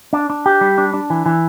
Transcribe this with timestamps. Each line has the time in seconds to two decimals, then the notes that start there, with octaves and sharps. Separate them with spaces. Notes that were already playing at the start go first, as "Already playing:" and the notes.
0.13 D4
0.30 D4
0.46 G4
0.61 G3
0.78 D4
0.94 D4
1.10 E3
1.26 E3